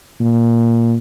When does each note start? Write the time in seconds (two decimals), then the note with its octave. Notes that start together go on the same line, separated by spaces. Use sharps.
0.20 A#2